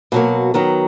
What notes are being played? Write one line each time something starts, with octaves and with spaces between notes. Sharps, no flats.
B2 F#3 A#3
D#3 F#3 B3